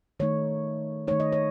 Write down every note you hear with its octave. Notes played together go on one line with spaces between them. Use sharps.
D#3 A3 D#4 C#5
D#3 A3 D#4 C#5
D#5
C#5